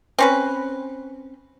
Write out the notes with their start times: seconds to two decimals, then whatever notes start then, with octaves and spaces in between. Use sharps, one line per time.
0.19 C4 C#4 B4